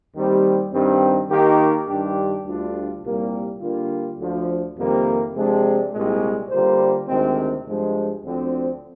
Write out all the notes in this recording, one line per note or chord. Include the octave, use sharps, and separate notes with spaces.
D#2 D#3 G3 C4
G2 D#3 G3 C4
D#3 A#3 D#4 G4
G2 D#3 G3 D4 G4
D2 D3 G3 D4 F4
C2 A#2 G3 A#3
D3 G3 A#3 F4
D2 D3 F3
F2 C3 D#3 G3 A#3
C3 F3 G#3 D4
C2 A#2 G#3
D3 G3 A#3 F4 C5
D2 C3 D#3 G#3 C4
G2 F3 G#3
D2 D3 F3 C4